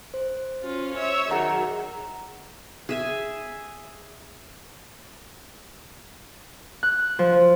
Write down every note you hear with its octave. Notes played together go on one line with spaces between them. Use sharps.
C5
C#4 F4
C#5 E5
D#3 F#3 G#4 F#5 A#5
G#4 E5 G#5
F#6
F3